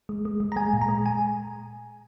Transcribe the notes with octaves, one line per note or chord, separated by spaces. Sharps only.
G#3
G#3
G#3
A#5
G#3 G#5
A#2
A#5
G#3
G#5